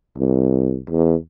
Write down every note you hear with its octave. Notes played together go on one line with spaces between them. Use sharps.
C2
E2